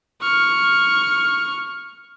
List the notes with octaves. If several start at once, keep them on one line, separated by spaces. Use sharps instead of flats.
C#6 F6